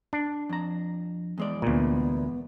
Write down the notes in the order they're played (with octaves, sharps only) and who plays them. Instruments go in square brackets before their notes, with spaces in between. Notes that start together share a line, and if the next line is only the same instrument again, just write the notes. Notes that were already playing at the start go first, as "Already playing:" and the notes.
[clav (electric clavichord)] D4
[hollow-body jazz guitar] F2 A#5
E2 G#3 D5
[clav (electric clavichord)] D2 A#2 [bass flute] B3